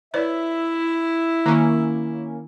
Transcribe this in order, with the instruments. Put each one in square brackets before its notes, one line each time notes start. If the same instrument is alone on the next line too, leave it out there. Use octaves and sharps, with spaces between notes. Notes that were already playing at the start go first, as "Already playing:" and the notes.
[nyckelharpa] E4 [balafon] B4 C#5 D5 [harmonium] E5
[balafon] D#3 [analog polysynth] A#3 C#4